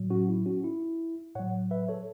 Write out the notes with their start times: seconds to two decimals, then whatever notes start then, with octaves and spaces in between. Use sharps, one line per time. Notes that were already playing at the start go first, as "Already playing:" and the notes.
Already playing: A2 F#3
0.10 C#4 F#4
0.29 E4
0.46 C#4 F#4
0.64 E4
1.35 A2 F#3 C#5 F#5
1.71 B4 E5
1.88 A4 C#5